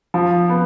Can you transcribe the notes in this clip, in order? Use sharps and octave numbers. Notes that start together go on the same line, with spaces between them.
F3
B3